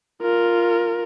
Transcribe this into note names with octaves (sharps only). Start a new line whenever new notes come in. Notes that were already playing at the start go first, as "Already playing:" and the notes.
F4 A#4